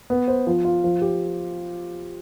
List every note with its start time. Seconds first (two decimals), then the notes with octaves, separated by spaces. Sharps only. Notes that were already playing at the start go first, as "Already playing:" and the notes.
0.10 B3
0.28 C5
0.47 F3
0.65 F4
0.84 F3
1.02 G4